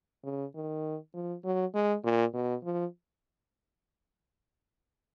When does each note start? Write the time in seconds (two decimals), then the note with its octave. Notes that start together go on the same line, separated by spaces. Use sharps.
0.24 C#3
0.55 D#3
1.14 F3
1.44 F#3
1.74 G#3
2.04 A#2
2.34 B2
2.64 F3